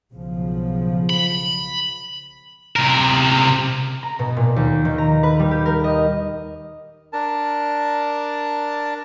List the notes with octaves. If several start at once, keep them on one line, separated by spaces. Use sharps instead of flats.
B1 C#3 F3
B5
C3 A#4
A#5
B2
A#2
D#2
D#3
A#5
B4
G3
G4
A#4
D#5
D4 A#4 A5